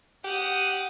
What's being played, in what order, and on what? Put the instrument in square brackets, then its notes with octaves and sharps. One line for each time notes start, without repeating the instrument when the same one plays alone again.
[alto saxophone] G4 [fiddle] F#5 D#6